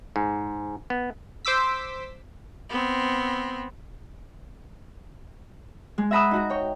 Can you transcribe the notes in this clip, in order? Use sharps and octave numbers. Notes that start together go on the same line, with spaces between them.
G#2
B3
C5 D6 E6 B6
B3 C4
G#3
E5 F#5 A#5 B5 D#6 E6
D#4 F#4 A#5
C#5 G5